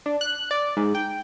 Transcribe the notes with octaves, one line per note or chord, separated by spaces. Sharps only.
D4
F#6
D5
G#2
G5